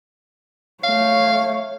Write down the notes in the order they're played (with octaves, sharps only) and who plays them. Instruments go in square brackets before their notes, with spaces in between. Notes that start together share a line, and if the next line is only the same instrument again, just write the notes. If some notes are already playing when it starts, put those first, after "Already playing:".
[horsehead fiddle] A3 C#5 [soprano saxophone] F5